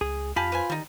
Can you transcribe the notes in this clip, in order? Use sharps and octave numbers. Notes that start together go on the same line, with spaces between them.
C#2 G#4
F2 F4 G4 G#5 A5 B5
B4 C5 G#5
D#3 G3 D#4